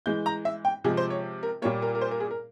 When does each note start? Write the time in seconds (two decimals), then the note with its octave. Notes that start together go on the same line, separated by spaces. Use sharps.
0.06 E3 G#3 G6
0.26 A#5
0.45 E5
0.65 G5
0.84 C3 F3 G#3 G#4
0.97 C5
1.10 C#5
1.43 A#4
1.62 A#2 G3 A#3 C#5
1.82 A#4
1.95 A#4
2.01 C5
2.11 A#4
2.20 G#4
2.31 A#4